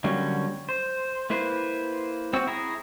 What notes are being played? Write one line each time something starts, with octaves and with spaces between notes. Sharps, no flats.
D3 F#3 G3 A#3 C#4
C5
A#3 E4 B4 C5
C4 F#4 E6
E4 G#4 A#5